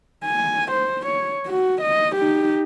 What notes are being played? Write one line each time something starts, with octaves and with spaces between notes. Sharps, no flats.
G#5
C5
C#5
F#4
D#5
D#4 G4